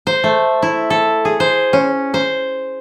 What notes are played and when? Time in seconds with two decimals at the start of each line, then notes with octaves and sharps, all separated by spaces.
0.07 C5
0.24 A3
0.62 E4
0.90 A4
1.25 G#4
1.40 C5
1.73 C#4
2.14 C5